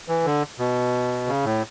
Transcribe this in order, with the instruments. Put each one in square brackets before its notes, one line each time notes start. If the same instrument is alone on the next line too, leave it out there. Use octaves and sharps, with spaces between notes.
[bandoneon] E3
D3
B2
C#3
A2